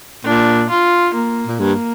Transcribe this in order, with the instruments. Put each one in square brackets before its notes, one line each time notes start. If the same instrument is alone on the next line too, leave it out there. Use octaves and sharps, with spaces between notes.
[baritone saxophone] A#2 [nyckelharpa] D4
[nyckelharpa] F4
A#3
[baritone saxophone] A#2
[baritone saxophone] G2 [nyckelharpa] A#3